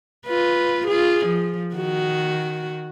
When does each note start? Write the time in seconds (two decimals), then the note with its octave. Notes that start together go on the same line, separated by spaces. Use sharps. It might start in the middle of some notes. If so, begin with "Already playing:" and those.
0.26 F4 B4
0.87 F4 G#4
1.26 F3
1.75 D#3 F#4